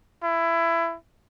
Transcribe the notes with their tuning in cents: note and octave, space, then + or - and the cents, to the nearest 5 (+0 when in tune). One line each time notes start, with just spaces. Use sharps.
E4 +20